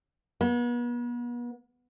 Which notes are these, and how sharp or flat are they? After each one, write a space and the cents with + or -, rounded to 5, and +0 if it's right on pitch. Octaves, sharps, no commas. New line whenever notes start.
B3 -40